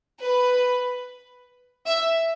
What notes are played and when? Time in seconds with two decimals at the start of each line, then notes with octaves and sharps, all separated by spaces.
0.19 B4
1.86 E5